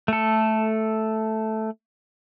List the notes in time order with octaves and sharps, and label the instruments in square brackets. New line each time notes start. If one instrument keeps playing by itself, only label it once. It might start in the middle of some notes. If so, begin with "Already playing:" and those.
[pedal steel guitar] A3 A4